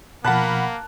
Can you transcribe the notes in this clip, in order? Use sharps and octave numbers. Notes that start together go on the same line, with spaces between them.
B2 F3 A#3 A#4 F#5 A5 B5 F#6